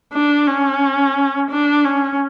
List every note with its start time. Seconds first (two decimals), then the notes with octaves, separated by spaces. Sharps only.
0.13 D4
0.47 C#4
1.51 D4
1.85 C#4